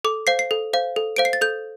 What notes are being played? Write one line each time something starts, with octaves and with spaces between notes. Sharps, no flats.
A4 D6
C5 F5 C7
C7
A4
C5 F5
A4
C5 F5 D7
C7
A6
A4 G6